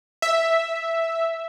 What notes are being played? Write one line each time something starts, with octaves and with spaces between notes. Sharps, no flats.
E5